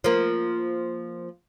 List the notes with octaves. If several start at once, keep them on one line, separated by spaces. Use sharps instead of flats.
F3 A#3